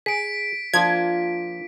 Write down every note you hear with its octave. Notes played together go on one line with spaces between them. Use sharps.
G#4 B6 D7
F3 A#3 D4 F4 G#6